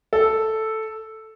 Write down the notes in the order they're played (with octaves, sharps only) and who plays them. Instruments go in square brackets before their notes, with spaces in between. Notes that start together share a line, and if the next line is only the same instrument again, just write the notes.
[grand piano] A4